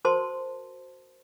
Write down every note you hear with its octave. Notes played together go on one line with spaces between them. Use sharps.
F#4 A#4 C5 A5 C6